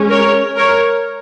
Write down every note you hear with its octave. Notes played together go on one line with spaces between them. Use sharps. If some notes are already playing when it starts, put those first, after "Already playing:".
Already playing: G#3 C#4
A#4 C#5
A#4 C#5